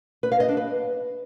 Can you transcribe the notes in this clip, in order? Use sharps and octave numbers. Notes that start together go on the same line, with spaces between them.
B4
F5
D#5
D4
B4